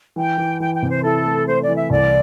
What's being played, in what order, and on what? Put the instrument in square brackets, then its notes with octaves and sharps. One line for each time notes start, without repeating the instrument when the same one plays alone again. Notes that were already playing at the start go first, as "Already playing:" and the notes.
[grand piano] E3 [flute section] G5
[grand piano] E3
[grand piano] E3 [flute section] G5
[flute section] G5
[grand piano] C3
[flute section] C5
[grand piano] E4 [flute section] A4
[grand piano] A3
[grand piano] A3 [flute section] C5
[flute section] D5
[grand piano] E3
[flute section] E5
[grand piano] C2 [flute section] D5